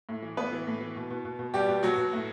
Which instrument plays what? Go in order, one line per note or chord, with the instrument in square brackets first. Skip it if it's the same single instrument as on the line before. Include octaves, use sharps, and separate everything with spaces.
[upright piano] A2
E3
A2 B3 B4
E3
A2
E3
B2
B2
B2
B2
B2 G3 G4
B2
B2 F#3 F#4
B2
A2